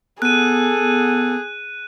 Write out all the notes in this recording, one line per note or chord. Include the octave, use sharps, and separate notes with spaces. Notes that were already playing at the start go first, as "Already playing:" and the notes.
B3 G#4 A4 F#6 D#7